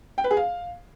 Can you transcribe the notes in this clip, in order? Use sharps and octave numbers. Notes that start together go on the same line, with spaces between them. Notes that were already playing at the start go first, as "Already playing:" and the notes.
G5
B4
G#4
F5